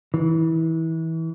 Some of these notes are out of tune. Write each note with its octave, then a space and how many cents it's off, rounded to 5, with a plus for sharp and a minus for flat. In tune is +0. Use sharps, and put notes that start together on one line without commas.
E3 -25